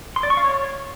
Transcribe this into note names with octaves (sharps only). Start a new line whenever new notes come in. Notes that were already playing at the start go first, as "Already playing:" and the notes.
C6
D5
C#6
F5
C#5